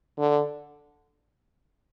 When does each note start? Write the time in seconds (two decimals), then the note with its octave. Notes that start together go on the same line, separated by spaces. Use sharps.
0.19 D3